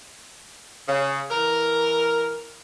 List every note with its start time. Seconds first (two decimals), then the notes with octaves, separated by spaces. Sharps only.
0.88 C#3
1.31 E3 A#4